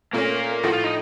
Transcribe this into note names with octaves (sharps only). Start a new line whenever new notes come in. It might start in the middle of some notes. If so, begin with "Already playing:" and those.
A#2 A3 A#3 C#4 A#4
A2 F3 A3 F#4
F4
D#4